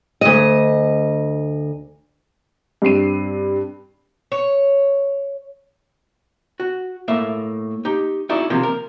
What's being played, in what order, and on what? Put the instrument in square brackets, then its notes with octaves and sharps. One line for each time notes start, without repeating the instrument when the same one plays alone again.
[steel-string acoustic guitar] D2 D#5
[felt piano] G2 C4 C7 D#7
[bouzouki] C#5
[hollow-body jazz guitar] F#4
A2 A#3 E5
D#4 G4
D#4 E4 F#4 G#4 D5
D#2 C3 F3 A#3
A#4